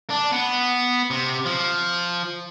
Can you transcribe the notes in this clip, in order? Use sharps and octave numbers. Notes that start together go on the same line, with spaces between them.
D4
B3
C3
F3